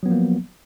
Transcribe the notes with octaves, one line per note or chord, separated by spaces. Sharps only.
F3 F#3 A#3 B3